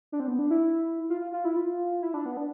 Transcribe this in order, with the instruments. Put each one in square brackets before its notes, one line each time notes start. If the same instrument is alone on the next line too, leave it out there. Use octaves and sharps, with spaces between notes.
[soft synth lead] D4
C4
B3
D4
E4
F4
F4
F4
E4
F4
E4
D4
B3
D4